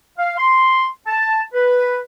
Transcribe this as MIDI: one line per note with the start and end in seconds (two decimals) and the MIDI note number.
0.18 0.36 77
0.38 0.88 84
1.07 1.42 81
1.54 1.99 71